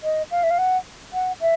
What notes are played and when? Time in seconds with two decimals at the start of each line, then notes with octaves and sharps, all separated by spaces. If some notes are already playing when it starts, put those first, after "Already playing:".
0.03 D#5
0.31 F5
0.43 E5
0.51 F5
0.58 F#5
1.13 F#5
1.41 E5